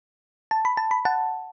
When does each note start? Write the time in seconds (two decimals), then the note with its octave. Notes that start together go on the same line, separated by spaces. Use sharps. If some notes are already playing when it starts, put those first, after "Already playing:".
0.51 A5
0.65 B5
0.77 A5
0.91 B5
1.05 F#5 A5